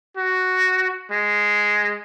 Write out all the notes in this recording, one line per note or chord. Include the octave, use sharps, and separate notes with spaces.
F#4
G#3